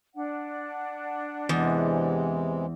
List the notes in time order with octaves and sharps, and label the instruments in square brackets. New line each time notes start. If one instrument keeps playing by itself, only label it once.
[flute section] D4 D5 F#5
[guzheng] E2 [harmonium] C3 E3 G#3